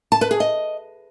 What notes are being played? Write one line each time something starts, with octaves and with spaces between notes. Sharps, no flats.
A5
B4
G#4
D#5